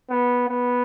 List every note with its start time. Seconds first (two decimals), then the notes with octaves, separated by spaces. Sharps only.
0.10 B3
0.49 B3